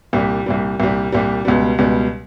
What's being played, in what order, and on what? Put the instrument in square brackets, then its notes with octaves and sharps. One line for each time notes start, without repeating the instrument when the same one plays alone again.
[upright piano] C2 A#2 G3
C2 A#2 G3
C2 A#2 G3
C2 A#2 G3
C#2 B2 G3
C#2 B2 G3